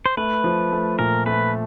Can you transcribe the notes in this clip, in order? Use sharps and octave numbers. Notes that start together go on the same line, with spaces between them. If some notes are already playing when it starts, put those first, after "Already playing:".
C5
A3 B4
F3
A3
A#2 A#4
A3 B4